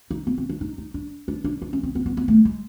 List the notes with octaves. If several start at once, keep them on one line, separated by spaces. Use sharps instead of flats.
D#4
B3
C4
D4
D#4
D#4
D4
D4
D4
D4
C#4
C4
B3
B3
B3
A3
G#3